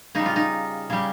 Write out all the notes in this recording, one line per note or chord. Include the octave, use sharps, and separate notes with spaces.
C#3 G3 D#4
F4
D#4
C#3 G3